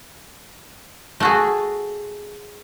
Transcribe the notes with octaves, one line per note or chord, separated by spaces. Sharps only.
A3 F#4 G#4